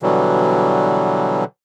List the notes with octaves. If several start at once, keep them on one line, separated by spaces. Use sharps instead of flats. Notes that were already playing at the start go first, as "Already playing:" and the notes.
B2 D3 E3 F#3 G3